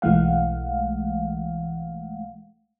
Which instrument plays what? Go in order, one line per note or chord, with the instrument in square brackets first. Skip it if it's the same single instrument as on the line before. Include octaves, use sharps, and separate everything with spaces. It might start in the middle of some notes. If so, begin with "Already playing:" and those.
[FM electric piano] B1 E3 G#3 A3 F5 F#5